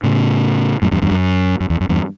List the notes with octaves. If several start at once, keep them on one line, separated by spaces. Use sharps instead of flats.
A2 C#3
F#2 A2
E2 G2
E2 G2
F#2
F#2
E2
F#2
E2 G2